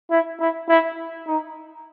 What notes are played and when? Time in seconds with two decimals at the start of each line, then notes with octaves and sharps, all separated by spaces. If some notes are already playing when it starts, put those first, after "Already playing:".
0.11 E4
0.40 E4
0.69 E4
1.27 D#4